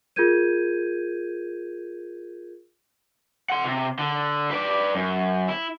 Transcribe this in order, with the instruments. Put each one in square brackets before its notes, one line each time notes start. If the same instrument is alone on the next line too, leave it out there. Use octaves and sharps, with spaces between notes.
[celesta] F4 G#4 A#4 G6 G#6 D#7
[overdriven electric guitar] F#5 C6
C3
D3
B4 D5
F#2
E4